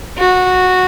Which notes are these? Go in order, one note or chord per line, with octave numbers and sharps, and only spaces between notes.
F#4